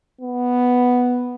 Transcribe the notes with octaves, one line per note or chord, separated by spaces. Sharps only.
B3